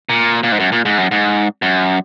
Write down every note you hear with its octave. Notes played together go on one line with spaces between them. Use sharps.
A#2
A#2
G#2
F#2
A#2
G#2
F#2
G#2
F#2